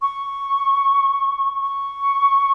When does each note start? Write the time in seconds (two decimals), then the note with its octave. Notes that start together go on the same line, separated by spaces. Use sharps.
0.01 C#6
1.60 C#6